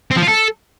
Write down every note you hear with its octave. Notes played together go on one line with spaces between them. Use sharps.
C4
F3
F4
A4